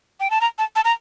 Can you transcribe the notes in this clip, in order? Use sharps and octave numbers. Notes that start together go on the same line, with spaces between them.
G5
A5
A#5
A5
A5
A#5